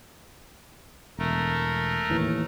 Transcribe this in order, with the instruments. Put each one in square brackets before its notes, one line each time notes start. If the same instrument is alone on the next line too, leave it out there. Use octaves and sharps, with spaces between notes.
[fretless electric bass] E1 [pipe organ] A3 A#4
[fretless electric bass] D#2 A2 E3